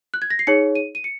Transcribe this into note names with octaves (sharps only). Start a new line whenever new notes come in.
F#6
G#6
A#6
C7
D#4 G#4 C#5 C#7
D#7
D#7
C#7